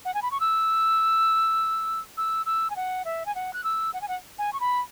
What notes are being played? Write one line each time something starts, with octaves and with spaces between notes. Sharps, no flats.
F#5
G#5
B5
C#6
E6
E6
E6
G#5
F#5
E5
G#5
F#5
F#6
E6
F#5
G#5
F#5
G#5
C#6
B5